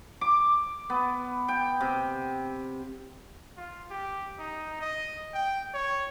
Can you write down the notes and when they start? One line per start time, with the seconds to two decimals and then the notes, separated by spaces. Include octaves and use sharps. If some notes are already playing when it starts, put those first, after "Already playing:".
0.21 D6
0.90 B3
1.48 G5
1.81 C3
3.57 F4
3.90 G4
4.38 D#4
4.80 D#5
5.34 G5
5.74 C#5